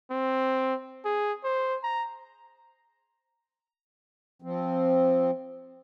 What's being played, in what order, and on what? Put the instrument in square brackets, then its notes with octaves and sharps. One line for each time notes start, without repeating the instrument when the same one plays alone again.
[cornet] C4
G#4
C5
A#5
[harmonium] F3 C4